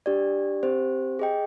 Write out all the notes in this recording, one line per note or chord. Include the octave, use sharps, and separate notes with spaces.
D4 G4 D5
C4 G4 C5
G#4 D#5 G5